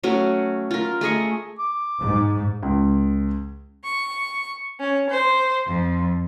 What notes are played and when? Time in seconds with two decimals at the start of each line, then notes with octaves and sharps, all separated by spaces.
0.03 F#3 A3 C#4 F#4
0.71 F4 A#4
1.01 A3 G#4 D#5 C#6
1.59 D6
2.00 G#2
2.63 C#2
3.83 C#6
4.79 C#4
5.08 C5
5.65 F2